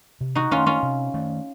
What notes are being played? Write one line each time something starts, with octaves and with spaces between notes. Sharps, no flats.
C3
D#4 F#4
D#3 A3 C#4 F4
C#4 F4
C3
D#3 A3